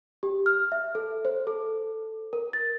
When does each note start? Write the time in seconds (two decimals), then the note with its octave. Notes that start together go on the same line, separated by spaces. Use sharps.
0.23 G4
0.46 F6
0.72 E5
0.95 A4
1.25 C5
1.47 A4
2.33 A#4
2.53 A6